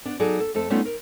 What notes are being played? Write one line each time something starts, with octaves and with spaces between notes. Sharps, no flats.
B3 D4
F#3 D#4 G#4 A4 D5
A4
F2 A3 A4
G3 A3 B3 C#4 D#4 F4
A#4